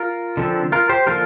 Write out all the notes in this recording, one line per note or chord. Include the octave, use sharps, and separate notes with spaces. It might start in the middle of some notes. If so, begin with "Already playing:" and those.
Already playing: F4 A#4
D3 F3 C4
F4 A#4
G4 C5
D3 F3 A#3 F4 A#4